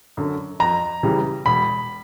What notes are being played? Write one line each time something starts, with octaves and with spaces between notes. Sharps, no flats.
F#2 D3
F2 A#5
C#3 E3 G3
E1 B5